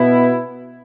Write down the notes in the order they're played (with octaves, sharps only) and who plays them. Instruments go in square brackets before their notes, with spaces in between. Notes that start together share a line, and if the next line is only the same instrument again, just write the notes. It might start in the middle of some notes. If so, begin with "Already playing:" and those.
Already playing: [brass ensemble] B2 B3 E4